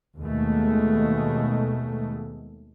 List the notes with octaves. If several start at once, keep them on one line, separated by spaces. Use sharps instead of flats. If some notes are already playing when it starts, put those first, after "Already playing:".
D#2 B2 G#3 A3